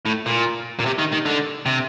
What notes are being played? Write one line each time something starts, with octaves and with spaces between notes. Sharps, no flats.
A2
A#2
A#2
C3
D#3
D#3
D3
C3